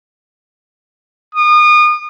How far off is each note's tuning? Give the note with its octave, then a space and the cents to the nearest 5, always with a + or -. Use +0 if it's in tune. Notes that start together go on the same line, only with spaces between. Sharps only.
D#6 -35